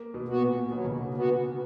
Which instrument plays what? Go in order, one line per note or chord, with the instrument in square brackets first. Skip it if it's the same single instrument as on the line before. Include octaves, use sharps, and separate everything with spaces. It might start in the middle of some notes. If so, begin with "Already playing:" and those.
Already playing: [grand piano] A#3
B2
[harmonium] B3 F#4
[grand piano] A#2
[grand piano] B2 [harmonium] F#3
[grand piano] C#3
D3
[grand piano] B2 [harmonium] B3 F#4